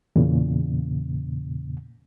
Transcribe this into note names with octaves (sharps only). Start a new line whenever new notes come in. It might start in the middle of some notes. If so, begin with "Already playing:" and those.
E2 A#2 C#3